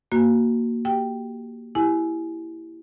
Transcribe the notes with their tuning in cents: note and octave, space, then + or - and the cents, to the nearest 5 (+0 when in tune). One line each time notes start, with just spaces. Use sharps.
A#3 +0 F#4 +0
G4 +0 G5 +0
E4 +0 G4 +0 G#5 +20